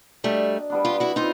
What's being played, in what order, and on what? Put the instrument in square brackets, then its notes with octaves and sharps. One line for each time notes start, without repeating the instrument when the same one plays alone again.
[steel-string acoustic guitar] G3 A3 [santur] D4 F#4 A#4 D#5
[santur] G3 B3 D4
[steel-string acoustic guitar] F4 G4
E4 F#4
[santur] C4 [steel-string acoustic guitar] D#4 F4